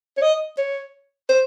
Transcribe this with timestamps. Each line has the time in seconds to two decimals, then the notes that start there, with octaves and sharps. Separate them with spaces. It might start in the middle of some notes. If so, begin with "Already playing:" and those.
0.17 C#5
0.22 D#5
0.58 C#5
1.29 C5